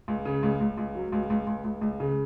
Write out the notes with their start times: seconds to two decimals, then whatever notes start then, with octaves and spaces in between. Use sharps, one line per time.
0.08 C#2
0.25 C#3
0.43 C#2
0.61 C#2
0.78 C#2
0.95 F#3
1.12 C#2
1.30 C#2
1.47 C#2
1.64 C#2
1.81 C#2
2.00 C#3